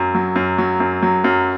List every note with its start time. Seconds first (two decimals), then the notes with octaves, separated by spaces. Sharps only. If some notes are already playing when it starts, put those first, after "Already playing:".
Already playing: F#2 F#3
0.15 F#3
0.36 F#2
0.58 F#3
0.80 F#2
1.03 F#3
1.24 F#2